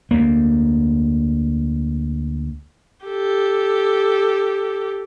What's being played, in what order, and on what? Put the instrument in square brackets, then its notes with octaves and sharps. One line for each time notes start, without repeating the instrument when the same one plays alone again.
[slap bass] D2 A#3
[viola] G4 A4